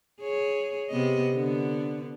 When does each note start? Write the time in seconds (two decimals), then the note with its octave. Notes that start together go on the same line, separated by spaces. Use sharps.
0.21 G#4 C#5
0.90 C3 B3 D#5
1.33 D3 B3